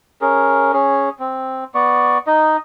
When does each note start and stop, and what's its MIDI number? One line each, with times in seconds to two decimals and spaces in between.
0.21 0.72 61
0.21 0.72 68
0.21 0.72 70
0.73 1.09 61
0.73 1.09 68
1.20 1.64 60
1.75 2.18 59
1.75 2.18 74
1.75 2.18 85
2.27 2.57 63
2.27 2.57 75